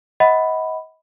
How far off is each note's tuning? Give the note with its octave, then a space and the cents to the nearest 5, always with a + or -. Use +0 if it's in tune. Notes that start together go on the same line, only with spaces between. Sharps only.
D#5 +35 F#5 +0 B5 +5